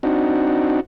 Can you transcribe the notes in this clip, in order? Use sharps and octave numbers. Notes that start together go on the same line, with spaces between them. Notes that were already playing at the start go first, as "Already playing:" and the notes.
C4 D4 D#4 F#4